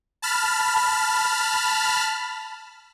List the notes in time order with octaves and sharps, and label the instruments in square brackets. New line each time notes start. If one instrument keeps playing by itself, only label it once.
[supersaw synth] A5 B5 F6